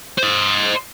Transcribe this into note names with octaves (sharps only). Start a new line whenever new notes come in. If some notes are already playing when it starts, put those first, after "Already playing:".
C5 D#5